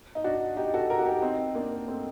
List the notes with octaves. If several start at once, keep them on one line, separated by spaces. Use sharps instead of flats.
D#4
D4 F#4
D#4 G4
F#4 A4
G4 A#4
F#4
D#4 G4
C4 D#4
A#3 D4
A3 C4